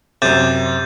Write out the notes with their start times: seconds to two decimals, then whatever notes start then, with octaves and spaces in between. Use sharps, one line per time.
0.22 F#2 C3 F#3 D6 G6 A6